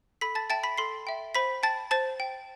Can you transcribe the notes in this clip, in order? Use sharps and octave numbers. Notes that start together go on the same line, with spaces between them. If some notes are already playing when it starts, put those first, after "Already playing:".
A4 B5 B6
A5 A6
E5 G5 A5 A6
B5 B6
A4 C6 C7
E5 G5
C5 B5 B6
G5 A5 A6
C5 A5 A6
G5